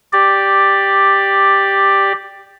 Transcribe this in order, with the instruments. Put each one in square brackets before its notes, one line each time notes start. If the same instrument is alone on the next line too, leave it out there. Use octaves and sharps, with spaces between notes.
[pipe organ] G4 D5